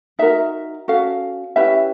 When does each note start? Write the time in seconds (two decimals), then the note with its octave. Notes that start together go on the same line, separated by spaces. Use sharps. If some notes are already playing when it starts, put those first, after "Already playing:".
0.19 D#4 F#4 A#4 E5
0.88 C#4 F#4 A4 F5
1.56 C#4 E4 G4 B4 E5